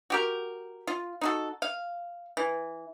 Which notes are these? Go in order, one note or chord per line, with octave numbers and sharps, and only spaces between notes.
F#4 G4 A#4
F4
D#4 F#4 A4
F5
E3